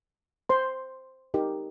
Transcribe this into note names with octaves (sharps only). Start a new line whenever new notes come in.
C5 C6
D#4 G4 A#4